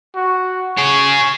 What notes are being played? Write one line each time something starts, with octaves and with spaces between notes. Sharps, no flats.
F#4
G#4 C#5 C#6